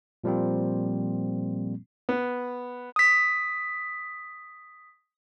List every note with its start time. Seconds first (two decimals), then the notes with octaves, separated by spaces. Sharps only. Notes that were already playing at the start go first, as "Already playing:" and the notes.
0.24 A#2 F3 G3 A#3 C4
2.09 B3
2.96 D#6 B6